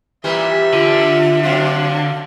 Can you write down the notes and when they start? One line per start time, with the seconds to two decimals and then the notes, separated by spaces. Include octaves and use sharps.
0.24 A#2 E3 G3 E5
0.73 D3 F4
1.43 F#3 C4 D4 F5